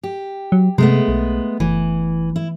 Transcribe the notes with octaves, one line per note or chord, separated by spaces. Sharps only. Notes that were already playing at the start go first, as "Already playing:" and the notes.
G4
F#3
C3 G#3 A3 B3
B1
F#1 E3
E4